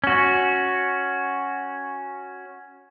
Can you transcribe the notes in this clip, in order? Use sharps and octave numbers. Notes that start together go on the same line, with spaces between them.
C#4 F#4